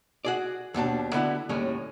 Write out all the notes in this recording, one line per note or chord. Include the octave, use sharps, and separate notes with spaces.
F#4 G#4 D5
D#2 B2 D4 A5
D3 B3 E4 F#4
D#2 A2 G3 G#3 C#4